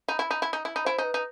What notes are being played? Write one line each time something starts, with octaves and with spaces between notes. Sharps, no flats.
D#4 B5
E4
D#4 B5
E4
D#4
E4 B5
D#4
E4 C5
D#4
B4
D#4